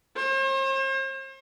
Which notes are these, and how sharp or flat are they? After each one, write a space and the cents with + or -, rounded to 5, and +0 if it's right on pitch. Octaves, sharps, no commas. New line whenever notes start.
C5 +45